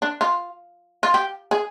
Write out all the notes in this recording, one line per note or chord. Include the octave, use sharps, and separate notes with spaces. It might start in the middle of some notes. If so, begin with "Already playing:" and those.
D4
F4
F4
G4
G#4